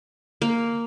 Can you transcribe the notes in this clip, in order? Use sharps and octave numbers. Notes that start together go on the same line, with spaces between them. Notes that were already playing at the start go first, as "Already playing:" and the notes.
A#3